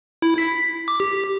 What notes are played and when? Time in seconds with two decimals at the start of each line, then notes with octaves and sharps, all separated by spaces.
0.22 E4
0.38 B6
0.88 D6
1.00 G4